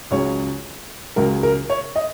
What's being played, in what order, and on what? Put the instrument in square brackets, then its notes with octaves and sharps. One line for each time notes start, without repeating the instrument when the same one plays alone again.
[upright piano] C#2 C#3 F#3 C#5
C#2 C#3 F#3 A#4
A#4
C#5
D#5